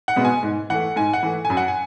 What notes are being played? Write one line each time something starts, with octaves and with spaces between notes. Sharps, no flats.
F#5
B2 G#3 B3
G#5
G#2
E3 A3 F#5
G#2 G#5
F#5
E3 A3
G#5
F#2
F#5
G#5